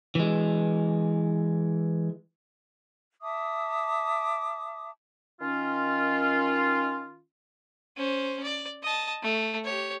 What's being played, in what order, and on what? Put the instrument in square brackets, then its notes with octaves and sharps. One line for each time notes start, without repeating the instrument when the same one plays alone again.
[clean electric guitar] E3 G#3
[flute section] E5 A5 D6 D#6
[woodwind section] D#3 C#4 F4
[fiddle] C#4 C5
D5
D#5 A5
A3
G4 C#5